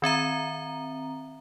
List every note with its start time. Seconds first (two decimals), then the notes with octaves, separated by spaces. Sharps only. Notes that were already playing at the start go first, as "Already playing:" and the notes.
0.02 D#3 C4 E5 A#5